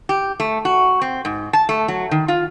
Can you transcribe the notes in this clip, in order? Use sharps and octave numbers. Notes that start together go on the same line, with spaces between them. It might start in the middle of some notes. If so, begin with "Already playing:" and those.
G4
A3
F#4
C4
G#2
A5
A3
F#3
D#3
F4